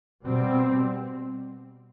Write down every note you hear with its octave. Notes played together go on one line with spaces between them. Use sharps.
B2 G3 C4